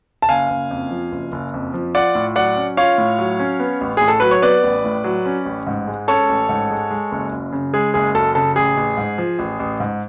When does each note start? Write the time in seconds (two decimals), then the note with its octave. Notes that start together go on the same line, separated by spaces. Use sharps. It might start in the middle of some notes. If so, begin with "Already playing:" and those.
0.22 A5
0.29 F#1 F5 G#5
0.50 F#1
0.71 F2
0.91 F3
1.12 F#1
1.32 F#1
1.54 F2
1.74 F3
1.95 F4 D5 F#5
2.15 A2
2.36 F#3 D5 F#5
2.56 C#4
2.77 F4 C#5 F5
2.98 A2
3.19 F#3
3.39 C#4
3.60 B3
3.81 A1
3.97 A2 G#4
4.08 A4
4.20 F#3 B4
4.31 C#5
4.42 B3 B4 D5
4.64 A1
4.85 A2
5.04 F#3
5.26 C#4
5.46 A1
5.67 G#2
5.87 G#3
6.08 C#4 A4 C#5
6.29 A1
6.49 G#2
6.71 G#3
6.91 G#3
7.12 F#1
7.32 F#2
7.52 C#3
7.73 G#3 G#4
7.94 F#1 G#4
8.15 F#2 A4
8.35 C#3 A4
8.56 A1 G#4
8.77 A1
8.97 G#2
9.18 F3
9.39 A1
9.60 A1
9.80 G#2